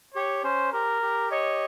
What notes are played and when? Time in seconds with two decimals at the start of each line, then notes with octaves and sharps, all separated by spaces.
0.14 G4 C#5
0.43 C#4 C5
0.72 G4 A#4
1.02 G4
1.31 C#5 D#5